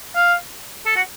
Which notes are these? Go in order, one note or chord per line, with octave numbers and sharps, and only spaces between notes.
F5
A4
F#4